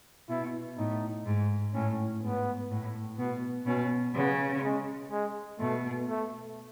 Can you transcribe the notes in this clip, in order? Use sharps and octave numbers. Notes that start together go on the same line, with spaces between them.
B2 E4
A2 D#4
G#2
A2 C#4
G#2 B3
A2
B2 B3
B2 C#4
C#3 B3
G#3
G#3
B2 A3
A3